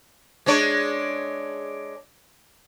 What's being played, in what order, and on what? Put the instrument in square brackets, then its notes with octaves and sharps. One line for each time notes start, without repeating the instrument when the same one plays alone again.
[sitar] G#3 D4 C#5